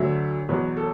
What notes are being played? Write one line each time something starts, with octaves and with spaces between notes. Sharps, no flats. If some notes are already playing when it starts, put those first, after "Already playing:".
Already playing: D2 D3 F#3 E5
E2 B2 F#3 B4
A4